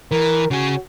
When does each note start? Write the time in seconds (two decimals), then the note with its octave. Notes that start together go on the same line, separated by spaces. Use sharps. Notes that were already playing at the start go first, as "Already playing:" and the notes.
0.11 E3 A#4
0.51 C#3 F#4 G#4